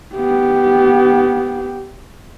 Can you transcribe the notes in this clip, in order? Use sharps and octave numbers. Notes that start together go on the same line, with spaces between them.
B3 G4